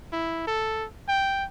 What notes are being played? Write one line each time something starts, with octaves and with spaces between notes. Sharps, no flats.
E4
A4
G5